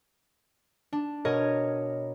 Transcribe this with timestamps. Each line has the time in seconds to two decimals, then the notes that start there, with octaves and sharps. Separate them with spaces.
0.93 D4
1.25 B2 A#4 C#5 D#5 G#6